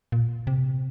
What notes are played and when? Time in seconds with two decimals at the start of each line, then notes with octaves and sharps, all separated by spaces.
0.12 A#2
0.47 C3